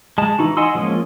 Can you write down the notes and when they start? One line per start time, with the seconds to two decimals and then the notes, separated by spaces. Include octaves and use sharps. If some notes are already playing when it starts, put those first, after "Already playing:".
0.18 G#3 A5
0.39 E3 D#4 F#4
0.57 D#5 F#5 G#5 C6 E6
0.75 F3 G#3 A#3 C#4 D#5